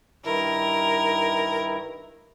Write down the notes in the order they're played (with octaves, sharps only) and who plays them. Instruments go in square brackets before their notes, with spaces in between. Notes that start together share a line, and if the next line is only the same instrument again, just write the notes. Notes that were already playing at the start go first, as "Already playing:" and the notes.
[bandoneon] G2 D#3 E4 [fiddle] A#4